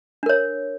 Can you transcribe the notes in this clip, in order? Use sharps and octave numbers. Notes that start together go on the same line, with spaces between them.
D4 A#4 C#5